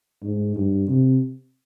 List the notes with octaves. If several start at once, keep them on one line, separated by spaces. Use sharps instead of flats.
G#2
G2
C3